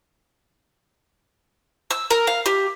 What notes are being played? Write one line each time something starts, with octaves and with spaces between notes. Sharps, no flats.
E6
A#4
F5
G4